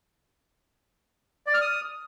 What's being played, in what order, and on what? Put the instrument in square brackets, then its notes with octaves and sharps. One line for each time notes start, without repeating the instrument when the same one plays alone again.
[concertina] D5
F6
D#6